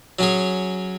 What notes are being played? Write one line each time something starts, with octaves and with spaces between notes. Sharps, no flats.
F#3 C#4 G#4